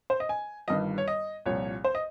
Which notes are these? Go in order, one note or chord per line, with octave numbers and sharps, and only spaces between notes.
C5
D#5
G#5
G1 G2 D#3 D#5
C#5
D#5
C2 A#2 F3 C#5
C5
D#5